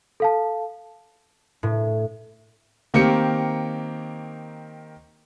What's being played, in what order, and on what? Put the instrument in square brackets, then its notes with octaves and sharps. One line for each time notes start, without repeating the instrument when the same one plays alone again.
[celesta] A4 F5 A5
[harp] A2
[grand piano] D#3 A#3 C4 G4 C#7